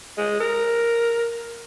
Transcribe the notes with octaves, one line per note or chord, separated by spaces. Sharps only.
G#3
A#4